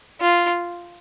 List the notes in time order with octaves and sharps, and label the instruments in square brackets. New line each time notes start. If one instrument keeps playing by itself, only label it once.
[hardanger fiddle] F4